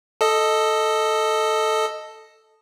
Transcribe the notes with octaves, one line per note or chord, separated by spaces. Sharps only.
A4 D#5